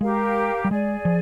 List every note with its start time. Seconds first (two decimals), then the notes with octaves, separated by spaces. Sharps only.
0.01 G#3 G4 A#4 F5
0.65 G3
0.70 G#3 G#4 D5 G#5
1.05 F3